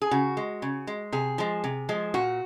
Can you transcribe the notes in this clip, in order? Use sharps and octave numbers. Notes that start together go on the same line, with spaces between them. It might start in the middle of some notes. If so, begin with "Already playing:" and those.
G#4
C#3 F#4
G#3
C#3
G#3
C3 G#4
F3 G#3
C3
F3 G#3
A#2 F#4